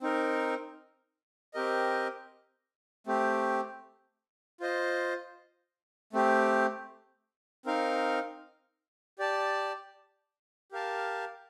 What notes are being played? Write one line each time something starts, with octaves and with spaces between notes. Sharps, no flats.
C4 D#4 A#4
C4 G4 A#4 D#5
A3 C4 G4
F4 C5 D#5
A3 C4 G4
C4 D#4 A#4 F5
G4 D5 A5
G4 A#4 F5 A5